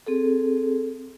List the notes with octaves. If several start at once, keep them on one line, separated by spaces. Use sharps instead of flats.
C4 G#4 A4